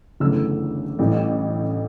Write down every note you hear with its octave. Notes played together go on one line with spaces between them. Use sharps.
G1 F#2 C#3 E3 A3 E6
A1 A2 E3 G3